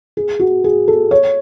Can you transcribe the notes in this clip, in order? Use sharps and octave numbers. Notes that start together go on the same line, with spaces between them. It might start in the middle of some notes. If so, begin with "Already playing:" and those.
G#4
F#4
G#4
A4
C#5